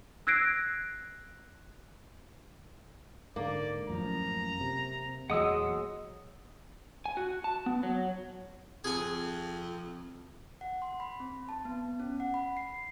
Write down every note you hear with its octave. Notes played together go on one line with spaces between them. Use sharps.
E6 F#6 G#6 A#6 C7 D7
G#2 D3 A#3 D5
A1 F#2 F3 A#5
C3
E2 A#2 F#3 G#3 F#5 D#6 E6
G#5
F#4
A5
B3
F#3
F2 G#4 G#5
F#5
C6
B5
C4
A5
B3
C#4
F#5
B5
C7